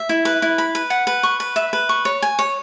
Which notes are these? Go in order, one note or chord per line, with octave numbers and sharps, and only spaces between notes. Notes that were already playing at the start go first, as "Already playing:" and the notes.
Already playing: E5
E4
B4
E4
B5
B4
F#5
B4
C#6
B4
E5
B4
C#6
C#5
G#5
C#5